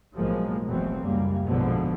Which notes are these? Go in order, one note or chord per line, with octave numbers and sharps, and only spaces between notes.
B1 A2 F3 G#3 A#3
F1 B2 E3 F#3 A3 C4
C#2 F#2 G3 A#3
A#1 G#2 B2 D3 F3 B3